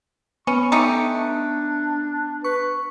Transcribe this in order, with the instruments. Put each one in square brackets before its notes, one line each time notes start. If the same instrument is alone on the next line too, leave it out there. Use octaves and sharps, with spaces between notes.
[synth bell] B3 [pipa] C#4 [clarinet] C#6
[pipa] A3 D#4 G4
[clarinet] D4
[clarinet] B4 [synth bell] C#6